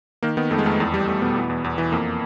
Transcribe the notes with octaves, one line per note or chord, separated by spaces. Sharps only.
D#3 A#3
D#3 B3
F2 A3
G#3
F2 A3
E2
G3
E2 A3
B2 B3
E3
E2
E2
E3
F2 A#3